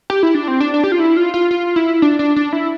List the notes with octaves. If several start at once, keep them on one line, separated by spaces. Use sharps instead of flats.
G4
E4
D4
C4
D4
D4
G4
F4
E4
F4
F4
F4
E4
D4
D4
D4
E4